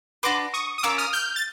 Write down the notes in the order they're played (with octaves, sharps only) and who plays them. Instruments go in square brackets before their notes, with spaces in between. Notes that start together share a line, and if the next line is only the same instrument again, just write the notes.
[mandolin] D4 F#4 B4 [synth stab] C6 D6
[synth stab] C#6 D#6
D#6
[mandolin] C#4 F4 A#4 [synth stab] D6 E6
[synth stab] D#6 F6
F6 G6
A6